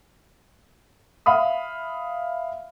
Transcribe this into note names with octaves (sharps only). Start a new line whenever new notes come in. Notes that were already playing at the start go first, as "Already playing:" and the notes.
E5 F5 B5 D#6